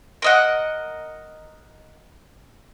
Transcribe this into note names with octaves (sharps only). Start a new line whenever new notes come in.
A#4 D#5 F#5